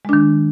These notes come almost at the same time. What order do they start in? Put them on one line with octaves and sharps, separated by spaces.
G#3 D4 D#3